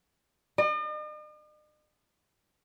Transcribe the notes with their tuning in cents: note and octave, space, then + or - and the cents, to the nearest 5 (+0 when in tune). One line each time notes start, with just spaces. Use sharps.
D#5 -45